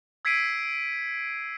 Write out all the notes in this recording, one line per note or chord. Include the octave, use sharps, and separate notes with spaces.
E6 G#6 B6 C7 D7 D#7